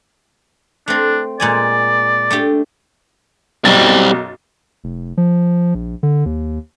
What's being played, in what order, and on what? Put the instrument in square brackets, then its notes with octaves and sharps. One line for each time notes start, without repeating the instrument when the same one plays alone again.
[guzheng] A3 C4 [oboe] D4
[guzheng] A#2 G#3 G#5 [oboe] D5
[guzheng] A3 D4 G4
[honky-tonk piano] B1 F#2 A6 [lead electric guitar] G3 C4
[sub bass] F1
F3
A#1
D3
D#2